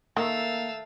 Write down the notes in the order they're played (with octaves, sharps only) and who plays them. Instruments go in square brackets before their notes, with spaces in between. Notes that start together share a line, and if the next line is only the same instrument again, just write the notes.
[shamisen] D#3 [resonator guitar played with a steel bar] A3 [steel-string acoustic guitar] A#3 [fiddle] F5 E6